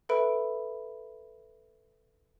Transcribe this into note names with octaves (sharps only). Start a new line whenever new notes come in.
A4 B4 E5 B5 D7